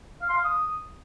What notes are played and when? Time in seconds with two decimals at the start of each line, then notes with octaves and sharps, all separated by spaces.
0.22 F5
0.29 C6
0.37 F5
0.44 D#6